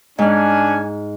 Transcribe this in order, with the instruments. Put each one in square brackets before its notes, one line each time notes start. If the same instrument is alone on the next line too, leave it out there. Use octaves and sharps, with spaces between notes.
[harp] G#2 F6 [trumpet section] C#4 D4 G#5